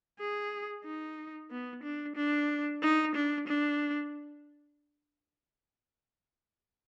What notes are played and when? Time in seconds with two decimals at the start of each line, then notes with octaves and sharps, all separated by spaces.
0.19 G#4
0.84 D#4
1.51 B3
1.83 D4
2.16 D4
2.82 D#4
3.15 D4
3.47 D4